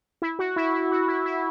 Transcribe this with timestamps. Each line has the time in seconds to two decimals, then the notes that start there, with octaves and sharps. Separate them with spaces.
0.22 E4
0.39 F#4
0.56 E4
0.73 E4
0.91 F#4
1.08 E4
1.26 E4